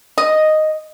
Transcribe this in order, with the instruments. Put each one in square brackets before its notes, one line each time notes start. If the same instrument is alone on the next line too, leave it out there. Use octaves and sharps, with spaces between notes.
[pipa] D#5